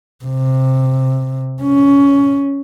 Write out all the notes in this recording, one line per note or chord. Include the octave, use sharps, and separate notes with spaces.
C3
C#4